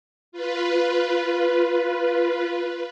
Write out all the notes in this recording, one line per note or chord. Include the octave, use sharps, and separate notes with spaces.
F4 B4